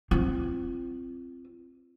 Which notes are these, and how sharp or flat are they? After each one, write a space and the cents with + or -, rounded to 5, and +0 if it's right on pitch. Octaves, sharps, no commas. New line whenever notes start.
C4 +5 F4 -30